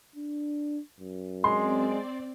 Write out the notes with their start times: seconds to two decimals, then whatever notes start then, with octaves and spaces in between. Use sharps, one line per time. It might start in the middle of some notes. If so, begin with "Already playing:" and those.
0.16 D4
1.00 F#2
1.44 G#3 C4 D5 C6